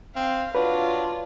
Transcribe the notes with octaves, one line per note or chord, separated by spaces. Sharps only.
C4 F5
F#3 D4 F4 B4